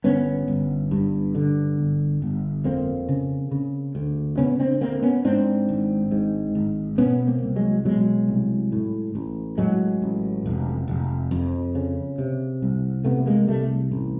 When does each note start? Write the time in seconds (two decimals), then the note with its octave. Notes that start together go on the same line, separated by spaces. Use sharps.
0.04 G1 B3 C#4
0.48 G1
0.91 G2
1.35 D3
1.78 G1
2.22 G1
2.64 F2 A#3 C4
3.09 C#3
3.51 C#3
3.95 D2
4.38 C#3 B3 C#4
4.60 C4 D4
4.81 D2 A#3 C4
5.03 B3 C#4
5.25 G#2 C4 D4
5.69 G#1
6.11 G#2
6.55 G#1
6.98 B2 B3 C#4
7.27 A#3 C4
7.42 C2
7.56 F#3 G#3
7.85 B2 F#3 G#3
8.28 C2
8.72 A2
9.15 A1
9.58 A2 F#3 G#3
10.02 A1
10.46 F1
10.88 F1
11.31 F2
11.75 C#3
12.18 C3
12.62 C2
13.04 C3 A3 B3
13.26 G#3 A#3
13.48 C2 G3 A3
13.92 A1